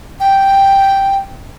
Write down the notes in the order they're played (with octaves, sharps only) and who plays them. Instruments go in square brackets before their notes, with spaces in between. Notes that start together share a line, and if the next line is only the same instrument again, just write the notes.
[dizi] G5